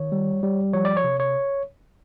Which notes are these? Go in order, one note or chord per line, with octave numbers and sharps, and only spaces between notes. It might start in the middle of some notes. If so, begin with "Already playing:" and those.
Already playing: D#3 C#5
G3
G3
F3 C#5
D5
C#5
C3
C#5